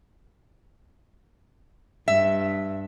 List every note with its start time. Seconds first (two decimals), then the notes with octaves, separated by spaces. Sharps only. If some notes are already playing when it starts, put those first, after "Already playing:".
2.08 G2 E5